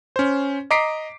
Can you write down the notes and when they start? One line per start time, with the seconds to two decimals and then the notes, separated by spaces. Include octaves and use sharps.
0.16 C#4 C5
0.71 D#5 A#5 D6 B6 C7 D7